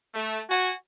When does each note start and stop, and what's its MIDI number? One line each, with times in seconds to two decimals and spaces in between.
0.14 0.40 57
0.50 0.72 66
0.50 0.72 80